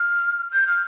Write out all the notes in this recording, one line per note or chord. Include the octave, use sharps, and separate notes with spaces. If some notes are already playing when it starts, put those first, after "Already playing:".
Already playing: F6
G6
F6